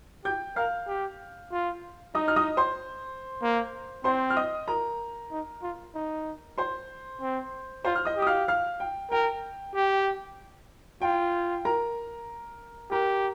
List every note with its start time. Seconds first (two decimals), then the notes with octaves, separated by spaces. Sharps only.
0.25 G4 G5 G6
0.56 A#4 F5 F6
0.88 G4
1.52 F4
2.15 D#4 D#5 D#6
2.28 F6
2.36 D#5 D#6
2.57 C5 C6
3.42 A#3
4.04 C4 C5 C6
4.30 F6
4.37 D#5 D#6
4.68 A#4 A#5
5.31 D#4
5.63 F4
5.95 D#4
6.58 C5 C6
7.21 C4
7.85 F4 C5 C6
7.95 F6
8.05 D#5 D#6
8.17 G4
8.22 D#6
8.27 F5 F6
8.48 F5 F6
8.80 G5
9.11 A#4 G5
9.75 G4
11.02 F4 G5
11.65 A#4 A#5
12.91 G4 A#4 A#5